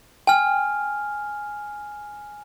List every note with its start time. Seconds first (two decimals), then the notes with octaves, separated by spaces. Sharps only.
0.27 G5 G#5 F6